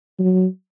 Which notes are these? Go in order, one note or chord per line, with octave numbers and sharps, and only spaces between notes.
F#3